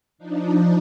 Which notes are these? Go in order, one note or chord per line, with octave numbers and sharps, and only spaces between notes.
F3 D4 D#4